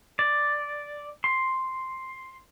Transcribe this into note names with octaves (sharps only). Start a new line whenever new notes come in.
D5
C6